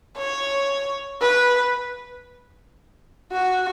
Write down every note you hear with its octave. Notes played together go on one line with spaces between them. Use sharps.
C#5
B4
F#4